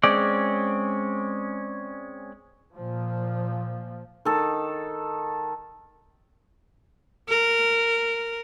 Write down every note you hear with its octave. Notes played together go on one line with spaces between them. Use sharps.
G#3 C4 C#4 D5
A#2 F3
D#3 A4
A#4